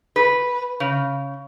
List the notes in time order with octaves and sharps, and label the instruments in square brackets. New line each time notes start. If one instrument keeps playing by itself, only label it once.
[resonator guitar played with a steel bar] B4
C#3